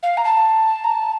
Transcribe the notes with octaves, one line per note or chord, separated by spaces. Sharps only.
F5
A#5
A5
A#5
A5